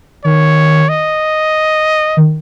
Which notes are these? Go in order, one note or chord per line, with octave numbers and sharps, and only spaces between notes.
D#3 C#5
D#5
D#3